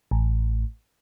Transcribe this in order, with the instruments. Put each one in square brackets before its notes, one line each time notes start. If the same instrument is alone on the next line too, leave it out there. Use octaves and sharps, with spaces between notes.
[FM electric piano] A1